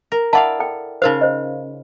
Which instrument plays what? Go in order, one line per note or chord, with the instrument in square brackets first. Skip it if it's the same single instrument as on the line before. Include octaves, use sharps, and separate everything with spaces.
[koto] A#4
[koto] E4 D5 F5 [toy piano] F#5 A5
[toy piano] A4 G5
[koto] C#3 F4 F5 [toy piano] D#4 A#4 C5
[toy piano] C5 D#5